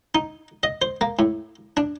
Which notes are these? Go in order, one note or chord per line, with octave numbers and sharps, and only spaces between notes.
D#4
D#5
C5
A#3
A2
D4